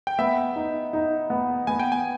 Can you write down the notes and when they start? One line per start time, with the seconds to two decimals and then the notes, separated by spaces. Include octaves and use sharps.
0.07 G5
0.19 B3 E5
0.56 D#4
0.93 D#4
1.30 B3
1.67 B3 G#5
1.80 G5
1.92 G#5